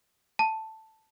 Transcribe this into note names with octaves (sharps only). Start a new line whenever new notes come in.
A5